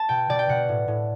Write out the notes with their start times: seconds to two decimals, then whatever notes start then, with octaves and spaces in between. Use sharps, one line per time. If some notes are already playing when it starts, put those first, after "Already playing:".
Already playing: A5
0.09 B2 G5
0.29 B2 D5
0.39 G5
0.49 B2 F#5
0.69 A2
0.88 A2